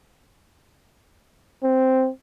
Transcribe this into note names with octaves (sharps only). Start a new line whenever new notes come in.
C4